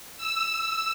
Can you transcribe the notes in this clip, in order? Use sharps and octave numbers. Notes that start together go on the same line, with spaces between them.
E6